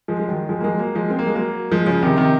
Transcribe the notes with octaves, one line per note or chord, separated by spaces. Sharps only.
F3 G#3
G#3
D#3 F#3
F3 G#3
A#3
F3 G#3
F#3 A#3
F3 G#3
C4
A#3
G#3
F#3 A#3
F3 G#3
C#3 F3
C3 D#3
C3 D#3